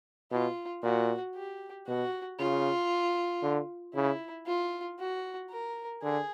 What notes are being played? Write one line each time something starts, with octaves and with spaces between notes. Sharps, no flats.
B2 F4
A#2 F#4
G4
B2 F#4
C#3 F4
D3
C#3 E4
F4
F#4
A#4
D3 G#4